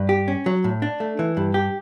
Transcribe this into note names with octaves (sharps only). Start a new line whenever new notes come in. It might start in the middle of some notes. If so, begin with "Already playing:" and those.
Already playing: G2
G4
C#4
F#3
A2
D4
A3
E3
G2
G4